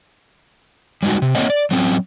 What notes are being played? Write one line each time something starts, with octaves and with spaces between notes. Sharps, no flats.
G3 G#3 D#4 F#4
C3
A3 A#3 C4 C#5 D#5 F#5
D5
F#3 C4 C#4